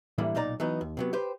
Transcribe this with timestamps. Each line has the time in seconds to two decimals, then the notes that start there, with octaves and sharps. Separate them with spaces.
0.18 A2 D3 E3 G3 A#3 E4
0.35 B1 A#2 D#4 D5 A#5
0.60 E3 F#3 B3 D#4
0.81 D#2
0.97 C3 F#3 B3
1.13 G4 B4 C5